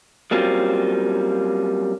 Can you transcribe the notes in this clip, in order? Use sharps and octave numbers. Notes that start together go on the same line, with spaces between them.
F#3 G3 A#3 C4 C#4 F4